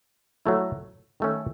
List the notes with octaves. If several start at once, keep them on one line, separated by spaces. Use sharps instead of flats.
F#3 A3 E4
D#3 A3 C#4